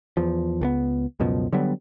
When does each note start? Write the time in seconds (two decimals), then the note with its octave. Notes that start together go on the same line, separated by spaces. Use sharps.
0.17 E2 F3
0.61 C#2 A3 B3
1.20 C#2 F#2 B2 F3
1.53 D3 F#3 G3 B3